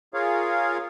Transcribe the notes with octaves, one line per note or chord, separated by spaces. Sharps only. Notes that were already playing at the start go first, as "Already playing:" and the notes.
F4 G#4 A#4 C#5 F5